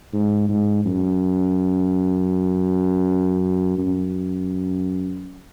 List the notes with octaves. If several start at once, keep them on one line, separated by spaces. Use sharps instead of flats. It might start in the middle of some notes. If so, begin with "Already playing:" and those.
G#2
G#2
F#2
F#2